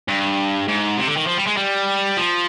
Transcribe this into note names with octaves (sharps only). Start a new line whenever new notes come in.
G2
G#2
C3
D3
D#3
F3
G3
G#3
G3
F3